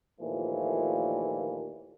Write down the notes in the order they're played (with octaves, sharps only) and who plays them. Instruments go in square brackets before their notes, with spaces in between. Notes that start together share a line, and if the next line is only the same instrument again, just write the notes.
[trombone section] D#2 A#2 E3 F3 A3